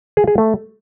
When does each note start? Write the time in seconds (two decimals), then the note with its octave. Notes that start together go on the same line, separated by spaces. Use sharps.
0.17 G#4
0.27 G#4
0.38 A3